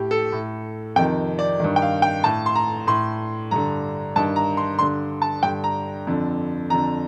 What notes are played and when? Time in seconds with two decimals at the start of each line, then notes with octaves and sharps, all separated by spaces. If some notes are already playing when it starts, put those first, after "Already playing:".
Already playing: A2 G4
0.11 A4
0.32 A2
0.96 F2 C3 D#3 G5
1.39 D5
1.60 G2 D#3
1.76 G5
1.82 F5
2.02 G5
2.24 A2 A5
2.46 C6
2.55 A#5
2.87 A2 C6
3.51 G2 D3 A#5
4.16 G2 A5
4.19 D#3
4.36 A#5
4.57 C6
4.79 G2 D3 C6
5.22 A5
5.43 G2 D3 G5
5.64 A#5
6.07 F2 D3
6.70 F2 D3 A#5